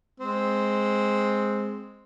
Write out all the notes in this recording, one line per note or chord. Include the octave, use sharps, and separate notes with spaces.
G#3 C4